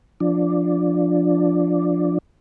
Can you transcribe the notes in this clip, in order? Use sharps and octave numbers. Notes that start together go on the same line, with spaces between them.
F3 D4